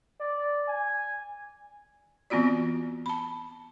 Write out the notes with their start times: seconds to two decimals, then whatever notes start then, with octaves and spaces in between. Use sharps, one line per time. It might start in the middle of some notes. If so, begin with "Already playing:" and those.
0.20 D5
0.68 G#5
2.30 E3 B3 C4 F4 F#4 D5
3.06 A5 B5